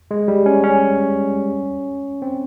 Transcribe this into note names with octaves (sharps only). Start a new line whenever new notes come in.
G#3
G3
C#4
C#4
C4